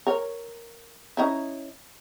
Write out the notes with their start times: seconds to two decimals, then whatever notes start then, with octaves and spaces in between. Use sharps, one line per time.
0.07 A#4 C#5
1.17 C#4 D#4 E4